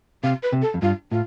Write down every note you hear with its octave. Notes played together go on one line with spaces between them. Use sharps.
C3 F5
B4
C3
A4
F2
G2 F4
A2 F4